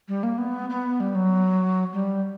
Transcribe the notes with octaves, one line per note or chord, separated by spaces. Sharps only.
G3
A#3
B3
B3
G3
F#3
G3